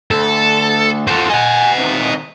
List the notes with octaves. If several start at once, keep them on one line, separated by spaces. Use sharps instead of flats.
D2 A4
F4 F#4 A4 C5
D#5 F#5 G#5
C3 D#3